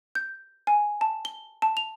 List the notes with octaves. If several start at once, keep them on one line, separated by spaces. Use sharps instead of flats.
G6
G#5
A5
G7
A5
F7